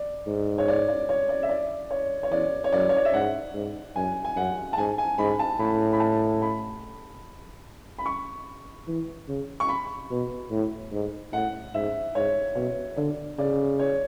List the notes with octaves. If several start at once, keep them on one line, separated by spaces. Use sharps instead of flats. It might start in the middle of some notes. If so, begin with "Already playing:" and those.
Already playing: D5
G#2
C#5
D5
D5
C#5
D5
E5
D5
C#5
C#5
E2 D5
C#5
F#2 D5
C#5
D5
E5
G#2 F#5
G#2
F#2 G#5
G#5
F#2 F#5
A5
G#2 G#5
G#5
G#2 B5
A5
A2 B5
B5
A5
B5
B5
C#6
E3
C#3
C#6
B5
B2
A2
G#2
A2 F#5
G#2 E5
G#2 C#5
B2 C#5
D3 D5
C#3 D5
C#5